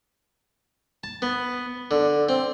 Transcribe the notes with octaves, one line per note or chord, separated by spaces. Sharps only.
A5
B3
D3
C4